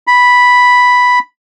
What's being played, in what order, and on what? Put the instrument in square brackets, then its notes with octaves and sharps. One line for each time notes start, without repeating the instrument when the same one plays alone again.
[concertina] B5